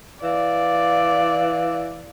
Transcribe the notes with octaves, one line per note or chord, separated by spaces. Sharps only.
E3 D5 F5